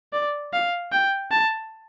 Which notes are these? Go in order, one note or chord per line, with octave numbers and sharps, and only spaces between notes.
D5
F5
G5
A5